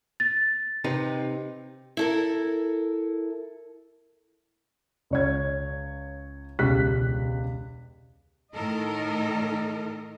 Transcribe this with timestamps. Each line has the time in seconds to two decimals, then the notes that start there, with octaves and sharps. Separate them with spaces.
0.20 A6
0.84 C3 D#4 B4
1.97 E4 A4 A#4
5.10 C#2 C#5 G#6
6.59 E1 C#2 G4 F#6 B6
8.53 A2 D#3 A4 A#4 D#5